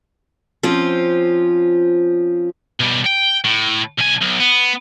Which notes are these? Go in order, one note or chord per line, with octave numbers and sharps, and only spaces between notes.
F3 C4 C#4 F4
B2 G3
G5
A2
B1 G#5
B1
B3